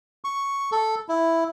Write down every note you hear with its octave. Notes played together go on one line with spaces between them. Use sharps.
C#6
A4
E4